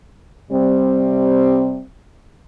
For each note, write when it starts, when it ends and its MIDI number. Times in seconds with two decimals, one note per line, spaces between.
0.51 1.83 48
0.51 1.83 55
0.51 1.83 60